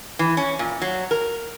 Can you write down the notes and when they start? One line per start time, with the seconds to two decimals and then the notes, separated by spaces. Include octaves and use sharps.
0.19 E3
0.37 C#4
0.59 A#2
0.82 F#3
1.11 A#4